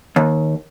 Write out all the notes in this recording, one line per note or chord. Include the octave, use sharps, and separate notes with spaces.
D#2